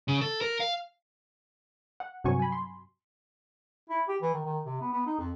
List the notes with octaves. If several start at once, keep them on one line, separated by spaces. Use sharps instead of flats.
C#3
A4
A#4
F5
F#5
G2 C3 F#3 F#4 G#5 C#6
G#5 B5
C6
E4
G4
E3
D#3
D#3
C3
B3
B3
D#4
F2